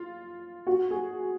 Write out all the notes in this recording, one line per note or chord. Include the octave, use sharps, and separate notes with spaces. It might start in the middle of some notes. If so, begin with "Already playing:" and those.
Already playing: F4
F#4
G#4